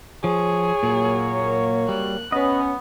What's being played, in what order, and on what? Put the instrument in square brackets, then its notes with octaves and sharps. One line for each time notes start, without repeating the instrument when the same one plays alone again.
[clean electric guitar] F3 [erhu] G#4 [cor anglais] C#5
[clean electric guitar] A#2 [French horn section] F#3 A#3
[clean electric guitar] G3 [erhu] F#6
[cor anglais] B3 [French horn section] C#4 [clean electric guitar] B4 D#5